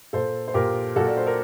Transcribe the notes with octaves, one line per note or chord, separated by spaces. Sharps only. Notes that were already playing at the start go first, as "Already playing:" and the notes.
A#2 A4 C5
C5
A#2 G4 A#4
A#2 F#4 A4
D5
C5
A#4